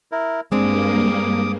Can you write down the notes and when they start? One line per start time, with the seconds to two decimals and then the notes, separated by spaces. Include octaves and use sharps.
0.12 E4 A#4
0.52 G2 G#3 A#3 C4 D4 D6 D#6